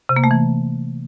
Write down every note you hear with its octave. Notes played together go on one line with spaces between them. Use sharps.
C3
A#3
A3
E3